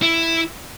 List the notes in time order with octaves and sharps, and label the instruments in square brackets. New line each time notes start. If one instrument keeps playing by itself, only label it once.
[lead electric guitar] E4